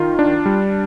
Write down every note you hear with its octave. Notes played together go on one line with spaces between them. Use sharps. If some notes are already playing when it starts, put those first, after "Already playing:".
Already playing: D#3 F4
D4
G3